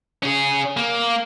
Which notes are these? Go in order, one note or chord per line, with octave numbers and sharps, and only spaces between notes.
C#4 G#4
A#3